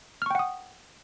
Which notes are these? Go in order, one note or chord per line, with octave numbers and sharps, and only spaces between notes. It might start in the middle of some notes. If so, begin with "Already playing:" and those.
F#5 G5 C#6 D#6 F6